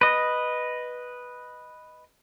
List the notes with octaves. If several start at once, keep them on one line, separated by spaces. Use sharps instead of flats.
B4 D#5